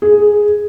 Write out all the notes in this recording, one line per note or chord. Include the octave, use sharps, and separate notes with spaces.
G#4